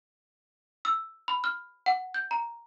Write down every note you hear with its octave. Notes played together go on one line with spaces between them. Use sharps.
E6
B5
F6
F#5
G6
A#5